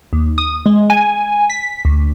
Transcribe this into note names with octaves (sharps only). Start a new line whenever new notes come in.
D#2
D#6
G#3
G#5
B6
D2